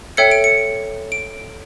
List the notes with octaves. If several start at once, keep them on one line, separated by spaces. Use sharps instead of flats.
A4 C#5 E5 G5 C#7
D7
C#7
D7